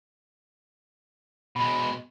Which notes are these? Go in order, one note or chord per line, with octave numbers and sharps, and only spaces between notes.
B2 G#3 B5